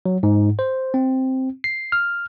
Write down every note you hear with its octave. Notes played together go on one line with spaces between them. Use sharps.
F#3
G#2
C5
C4
C7
F6